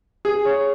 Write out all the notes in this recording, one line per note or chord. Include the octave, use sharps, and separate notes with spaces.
G#4
C#5